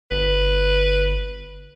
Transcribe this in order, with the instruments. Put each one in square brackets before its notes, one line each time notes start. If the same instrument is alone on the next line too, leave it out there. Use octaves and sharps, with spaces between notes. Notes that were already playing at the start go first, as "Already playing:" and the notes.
[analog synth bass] G1 [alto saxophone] B4